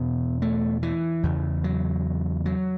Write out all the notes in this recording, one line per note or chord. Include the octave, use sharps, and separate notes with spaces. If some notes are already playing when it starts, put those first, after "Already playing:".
Already playing: E2 B2 B3
A3
E3
E2 C#3
F#3
F#3